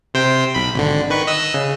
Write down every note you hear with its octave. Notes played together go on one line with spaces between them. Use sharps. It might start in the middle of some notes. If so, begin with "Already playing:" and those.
C3 C5 G5
B1 B5
G#1 D3
D#3 B4 C#6
D#5 E6 F#6
C#3